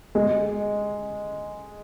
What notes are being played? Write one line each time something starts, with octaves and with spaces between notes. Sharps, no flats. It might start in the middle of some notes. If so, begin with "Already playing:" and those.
G#3